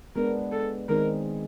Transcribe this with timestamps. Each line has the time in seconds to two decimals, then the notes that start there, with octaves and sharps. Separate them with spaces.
0.16 G#3 B3 D4 A#4
0.52 A4
0.89 D#3 G#3 C4 D#4 A#4